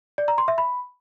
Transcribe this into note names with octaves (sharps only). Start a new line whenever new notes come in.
D5
A#5
C6
E5
B5